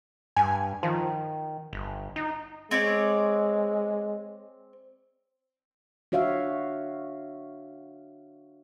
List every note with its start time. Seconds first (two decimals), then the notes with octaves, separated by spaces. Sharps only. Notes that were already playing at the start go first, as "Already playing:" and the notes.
0.36 G2 G#5
0.83 D#3 F3
1.73 G1
2.16 D#4
2.71 G#3 C4 C#5 D5
6.12 D4 F#4 C#5 E5 F5